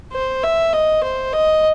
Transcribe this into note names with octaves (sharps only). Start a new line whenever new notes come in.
C5
E5
D#5
C5
D#5